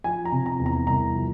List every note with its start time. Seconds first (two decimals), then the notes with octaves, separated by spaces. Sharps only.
0.04 F3 G#5
0.25 A#5
0.32 C3
0.46 A#5
0.60 E2
0.66 A#5
0.87 C2 A#5
1.15 F3